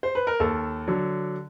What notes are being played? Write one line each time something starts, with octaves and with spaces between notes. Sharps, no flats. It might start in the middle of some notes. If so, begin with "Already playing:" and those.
C5
B4
A#4
D#2 A4
D3 F#3